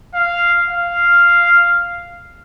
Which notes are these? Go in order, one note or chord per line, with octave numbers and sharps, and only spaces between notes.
F5
F5